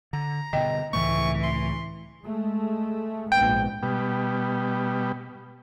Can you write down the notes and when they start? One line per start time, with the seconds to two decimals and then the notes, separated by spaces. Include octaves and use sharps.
0.13 D3 A#5
0.53 G2 B2 D3 D#5 G5
0.93 C#2 A2 E3 A3 C#6
1.43 C6
2.24 G#3 A3
3.32 A#1 G#2 B3 G5
3.83 B2 G3